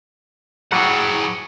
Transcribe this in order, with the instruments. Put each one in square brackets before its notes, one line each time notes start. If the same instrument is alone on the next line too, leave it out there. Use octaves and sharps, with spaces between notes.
[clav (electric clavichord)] A2 F#3 G3 [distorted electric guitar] G#4 F#5